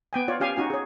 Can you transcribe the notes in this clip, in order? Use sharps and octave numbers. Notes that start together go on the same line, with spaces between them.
B3 G5 G#5
F4 C#5 D5
C#4 G4 F5 G#5
C#4 D#4 F#4 G#5
G#4 C#5